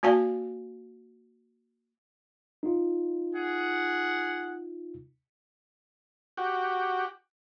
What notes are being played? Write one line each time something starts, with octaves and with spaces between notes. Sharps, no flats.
A#3 F#4 D5 F5 G#5 A5
D#4 F4
G#4 F#5
F#4 G4